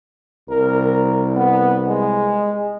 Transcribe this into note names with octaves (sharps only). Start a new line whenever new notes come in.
C2 A#4
B3
G#3